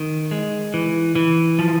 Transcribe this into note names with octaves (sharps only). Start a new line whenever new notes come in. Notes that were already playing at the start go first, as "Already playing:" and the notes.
Already playing: D#3
G#3
E3
E3
F3